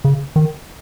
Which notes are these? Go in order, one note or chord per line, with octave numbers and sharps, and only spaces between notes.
C#3
D#3